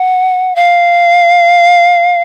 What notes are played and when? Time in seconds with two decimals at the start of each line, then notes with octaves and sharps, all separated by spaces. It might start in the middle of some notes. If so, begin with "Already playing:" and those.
Already playing: F#5
0.56 F5